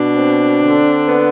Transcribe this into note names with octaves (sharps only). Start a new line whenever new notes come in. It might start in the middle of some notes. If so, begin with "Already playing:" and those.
Already playing: B2 D4
C4
D3
B3